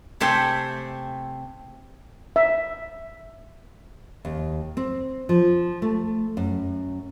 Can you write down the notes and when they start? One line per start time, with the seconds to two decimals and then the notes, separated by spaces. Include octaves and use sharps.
0.20 C3 A3 C4 E5 G5 G#5
2.36 E5
4.25 D#2
4.77 C4
5.29 F3
5.82 A3
6.37 F#2